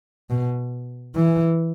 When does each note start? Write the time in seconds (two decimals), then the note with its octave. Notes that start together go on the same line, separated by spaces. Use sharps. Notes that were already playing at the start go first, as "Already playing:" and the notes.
0.30 B2
1.16 E3